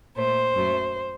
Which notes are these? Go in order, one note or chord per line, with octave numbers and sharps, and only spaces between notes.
A#2 A3 C5
F#2 F#3 A3